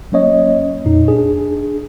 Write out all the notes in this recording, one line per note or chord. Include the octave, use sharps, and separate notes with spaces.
F#3 A#3 C#4 C#5 D#5
F2 A#2 D#4
D4 G#4